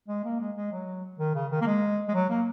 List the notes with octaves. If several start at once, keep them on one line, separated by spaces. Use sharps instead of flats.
G#3
A#3
G#3
G#3
F#3
D#3
C#3
D#3
A#3
G#3
G#3
F#3
A#3